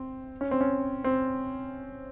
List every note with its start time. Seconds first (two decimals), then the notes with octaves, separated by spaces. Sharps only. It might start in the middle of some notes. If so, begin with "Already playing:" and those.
Already playing: C4
0.41 C#4
0.51 C4
0.61 C#4
1.04 C4